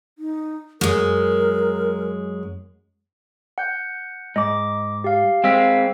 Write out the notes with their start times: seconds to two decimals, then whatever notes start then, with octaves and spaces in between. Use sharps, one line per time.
0.18 D#4
0.81 F#2 G#3 A#4
3.58 F#5 G6
4.36 G#2 D#5 D6
5.04 G4 F5
5.44 G#3 C4 F5 E6 B6